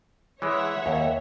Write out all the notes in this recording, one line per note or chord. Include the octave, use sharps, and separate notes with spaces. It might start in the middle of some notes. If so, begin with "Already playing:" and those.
E3 G#3 C#5 E5 F#5
D#2